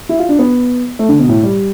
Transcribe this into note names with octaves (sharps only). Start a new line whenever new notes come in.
E4
F4
D4
B3
A3
D3
B2
A2
G3